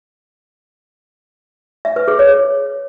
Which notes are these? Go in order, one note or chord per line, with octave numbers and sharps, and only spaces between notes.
E5
B4
G#4
C#5